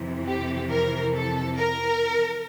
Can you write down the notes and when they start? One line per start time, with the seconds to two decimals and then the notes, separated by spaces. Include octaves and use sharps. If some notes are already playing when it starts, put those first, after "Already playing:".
Already playing: F2 C3 E3
0.27 G4
0.70 A#4
1.14 A4
1.57 A#4